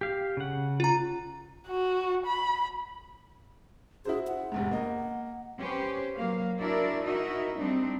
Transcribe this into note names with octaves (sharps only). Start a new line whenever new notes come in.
G4 F5
C#3 F#5
F4 A#5
F#4
B5
E4 F#4 G#4 C5
F#5
F1 E2 G#2
A#3 D#5
C#4 G4 B4 C5
F#3 A#3 F5
D4 E4 F#4 A#4 D5 E5
D#4 E4 F#4 A#4 D#5 E5
G3 C4 D4 D#4